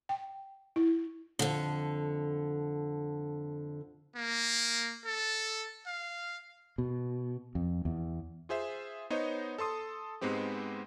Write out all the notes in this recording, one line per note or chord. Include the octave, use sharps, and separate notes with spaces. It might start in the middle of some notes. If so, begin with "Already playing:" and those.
G5
E4
F2 D3
A#3
A4
F5
B2
F2
E2
F4 G#4 C5 E5
B3 D#4 C5 C#5 D#5
A4 A5 C6 D#6
G#2 G#3 B3 C4 G4